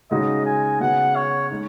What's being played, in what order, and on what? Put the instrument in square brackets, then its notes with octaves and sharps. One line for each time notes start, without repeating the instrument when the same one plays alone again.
[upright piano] C#3 G#3 D#4 F#4 [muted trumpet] D#5
[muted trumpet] G#5
[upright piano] C#3 B3 F#4 [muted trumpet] F#5
[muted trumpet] C#5
[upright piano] G#3 D#4